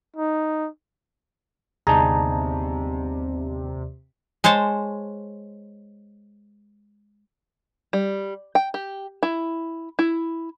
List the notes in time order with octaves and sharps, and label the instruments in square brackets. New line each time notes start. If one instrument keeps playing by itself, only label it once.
[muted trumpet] D#4
[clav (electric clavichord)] G1 D#4 G#4 [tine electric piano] D#2 D5 [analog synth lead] C3 [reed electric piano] A5 A#5
[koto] G#3 C5 C#5 A5
[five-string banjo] G3
G5
G4
E4
E4